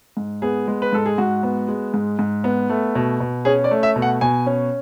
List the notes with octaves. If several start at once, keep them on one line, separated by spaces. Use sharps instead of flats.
G#2
B3 G#4
G#3
B4
G#2 A4
G#4
G#2 F#4
B3
G#3
G#2
G#2
B3
A3
B2
B2
C#4 G#4
D5
A3
E5
B2
F#5
B2 G#5
C#4